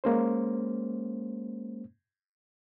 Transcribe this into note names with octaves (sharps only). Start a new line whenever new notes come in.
G#3 A#3 C#4 C5